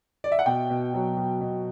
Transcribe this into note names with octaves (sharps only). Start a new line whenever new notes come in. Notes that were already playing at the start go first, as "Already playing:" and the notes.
D5
E5
F#5
B2 G5
B2
F#3
B2
B2